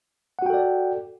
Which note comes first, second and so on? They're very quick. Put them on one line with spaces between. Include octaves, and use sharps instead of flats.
F#5 F#4 G5 A4 D5